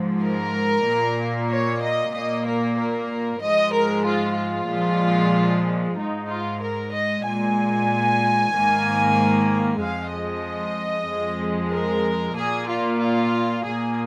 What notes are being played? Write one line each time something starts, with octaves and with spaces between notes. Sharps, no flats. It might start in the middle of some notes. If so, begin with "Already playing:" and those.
Already playing: G#2 F3 G#3
A#4
A#2 A#3
C#5
D#5
A#2 A#3 D#5
A#4
A#4
G#2 F3 G#3 D#5
A#4
F4
F4
A#2 F3 G#3
G#2 G#3 D#4
F4
A#4
D#5
A#2 G#3 G#5
G#2 D#3 A#3
F2 F3 G#3 F5
D#5
F2 F3 G#3
A#4
A#2 A#3 G#4
F4
F4
A#2 A#3 G#4